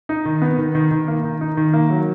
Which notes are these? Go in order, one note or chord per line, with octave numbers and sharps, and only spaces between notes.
D#4
D#3
B3
D#3
D#3
D#3
A#3
D#3
D#4
D#3
A#3
F#3